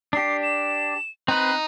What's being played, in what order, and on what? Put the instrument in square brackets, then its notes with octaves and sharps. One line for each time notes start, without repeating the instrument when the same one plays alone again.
[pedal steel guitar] D4 G4 [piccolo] C7
[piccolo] E7
[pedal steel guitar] C4 B4 [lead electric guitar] D#4 [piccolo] F#6